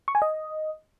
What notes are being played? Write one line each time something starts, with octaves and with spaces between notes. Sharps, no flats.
C#6
G#5
D#5